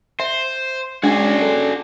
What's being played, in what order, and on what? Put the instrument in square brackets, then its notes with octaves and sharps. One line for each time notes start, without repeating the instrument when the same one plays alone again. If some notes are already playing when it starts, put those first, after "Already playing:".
[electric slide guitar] C5 [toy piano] E5
[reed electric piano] G#3 [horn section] C#4 D5 [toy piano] D4 [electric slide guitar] F#4 G#4
[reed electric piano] A4